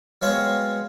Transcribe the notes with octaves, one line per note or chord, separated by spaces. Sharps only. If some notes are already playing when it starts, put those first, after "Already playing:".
F#3 G#3 B3 C4 C#5 F5